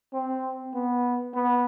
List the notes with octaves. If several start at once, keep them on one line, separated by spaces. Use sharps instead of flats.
C4
B3
B3